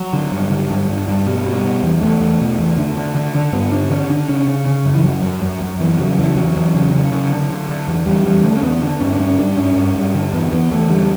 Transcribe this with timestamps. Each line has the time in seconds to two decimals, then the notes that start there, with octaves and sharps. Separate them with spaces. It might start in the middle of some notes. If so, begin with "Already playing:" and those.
Already playing: F#3
0.13 D3
0.32 G2
0.51 D3
0.70 G2
0.89 G2
1.08 G2
1.26 B2 G3
1.45 B2
1.65 B2
1.83 E2
2.01 E2 A3
2.21 E2
2.40 B2
2.58 E2
2.78 D3
2.97 D3
3.15 D3
3.35 D3
3.53 G2 B3
3.72 D3 D4
3.90 D3 C#4
4.10 D3 D4
4.29 C#3 C#4
4.47 C#3
4.66 C#3
4.85 F#2
4.94 E3
5.04 F#2 F#3
5.23 F#2
5.42 F#2
5.61 F#2
5.80 E2 E3
5.99 C#3 F#3
6.18 E2 E3
6.36 E2 F#3
6.56 E2
6.75 C#3
6.93 C#3
7.12 C#3
7.31 D3
7.50 D3
7.69 D3
7.88 E2
8.06 E2 G3
8.25 E2 G3
8.44 D3 A3
8.57 C#4
8.63 E2 B3
8.82 D3
9.01 G2 C#4
9.13 D4
9.20 G2 C#4
9.39 G2 D4
9.57 G2 C#4
9.76 G2
9.96 G2
10.14 D3
10.33 E2 B3
10.52 E2 B3
10.71 E2 A3
10.90 D3 G3